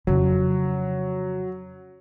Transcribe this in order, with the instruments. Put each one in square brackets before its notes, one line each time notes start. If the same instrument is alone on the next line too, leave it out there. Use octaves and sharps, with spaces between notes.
[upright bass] F2 C#3 [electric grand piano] F#3